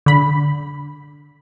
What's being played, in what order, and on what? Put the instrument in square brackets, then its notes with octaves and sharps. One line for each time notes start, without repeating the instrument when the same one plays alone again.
[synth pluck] D3 B5